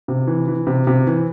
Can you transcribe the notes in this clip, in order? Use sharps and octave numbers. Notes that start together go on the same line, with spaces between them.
C3
E3
E3
C3
C3
E3